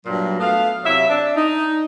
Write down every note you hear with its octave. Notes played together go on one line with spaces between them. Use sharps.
G2 A#2 F#3
A3 B3 F5
C3 F#3 E5
D4
D#4